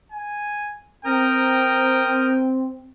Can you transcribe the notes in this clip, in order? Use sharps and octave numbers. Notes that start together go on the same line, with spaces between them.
G#5
C4 A#4 G5 A#5 D#6